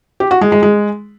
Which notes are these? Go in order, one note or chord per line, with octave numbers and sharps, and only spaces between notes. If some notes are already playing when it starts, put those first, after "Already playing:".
G4
F#4
G#3
G#3
G#3